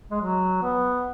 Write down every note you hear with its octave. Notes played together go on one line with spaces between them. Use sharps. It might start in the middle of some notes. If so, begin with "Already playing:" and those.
G#3
F#3
B3